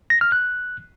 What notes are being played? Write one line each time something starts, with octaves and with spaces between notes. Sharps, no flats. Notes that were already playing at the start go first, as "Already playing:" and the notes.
A#6
F6
F#6